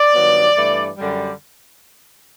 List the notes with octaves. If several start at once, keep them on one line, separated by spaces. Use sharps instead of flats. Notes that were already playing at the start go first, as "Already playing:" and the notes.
Already playing: D5
G2 D#3 F#3 B3
G2 E3 A3
F#2 D3 G3